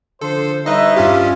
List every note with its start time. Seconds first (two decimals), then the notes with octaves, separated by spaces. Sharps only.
0.21 D3 F3 A4 C5
0.66 G3 D#4 B4 C#5 D#5 E5
0.96 G2 C#4 F4 G4